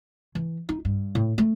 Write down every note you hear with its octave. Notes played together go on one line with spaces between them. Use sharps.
E3
D#4
G2
A2
A3